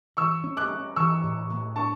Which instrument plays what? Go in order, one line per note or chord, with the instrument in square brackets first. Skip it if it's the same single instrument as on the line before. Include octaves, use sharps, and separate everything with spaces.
[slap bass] E3 [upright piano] C#6 E6
[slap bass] C#4
[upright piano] D6 F#6
[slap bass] C#4
[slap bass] E3 [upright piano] C#6 E6
[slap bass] A2
A2
[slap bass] D4 [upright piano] A5 C#6